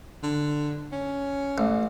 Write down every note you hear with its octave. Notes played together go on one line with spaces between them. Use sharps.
D3
C#4
A1